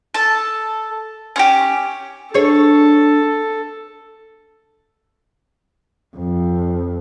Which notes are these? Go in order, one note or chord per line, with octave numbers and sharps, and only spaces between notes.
A4 A5
C#4 F4 G4
D4 G#4 A4 C#5
F2